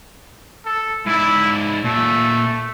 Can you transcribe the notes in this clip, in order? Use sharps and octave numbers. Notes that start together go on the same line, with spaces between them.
A4
G#2 E4 D5
A#2 A3 E5